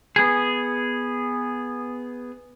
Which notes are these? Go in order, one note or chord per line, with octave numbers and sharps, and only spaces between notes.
B3 G#4